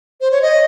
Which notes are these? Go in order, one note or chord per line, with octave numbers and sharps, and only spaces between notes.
C5
C#5
D#5